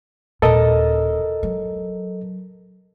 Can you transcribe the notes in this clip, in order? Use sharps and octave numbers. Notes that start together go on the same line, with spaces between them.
D#1 A#2 A4 A#4 D#5
F#3